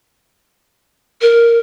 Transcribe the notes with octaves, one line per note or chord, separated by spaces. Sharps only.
A#4